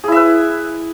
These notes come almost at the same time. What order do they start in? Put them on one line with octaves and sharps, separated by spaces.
G#4 E4 E5 B4